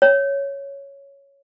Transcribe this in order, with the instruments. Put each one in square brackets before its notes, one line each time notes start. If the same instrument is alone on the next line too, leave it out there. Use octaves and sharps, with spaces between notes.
[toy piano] C#5